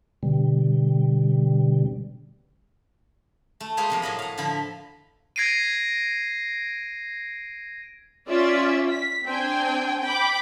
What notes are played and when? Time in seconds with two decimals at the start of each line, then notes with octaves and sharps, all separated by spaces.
0.23 B2 D3 G3
3.60 A3
3.77 G3 G#3 A#3 F4 G#4 C5
3.90 C3 F3 A#4
4.02 A2 F#3 D#5 B5
4.19 F5 F#5
4.38 D3 F3 E4 A#5 B5
5.36 G#6 A#6 C7 D7 D#7
8.27 C#4 F4 D5 E5
8.89 B6
9.24 C4 D4 G5 G#5
10.01 G5 B5 D6